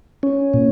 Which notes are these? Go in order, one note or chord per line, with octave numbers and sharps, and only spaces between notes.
C#4
A#2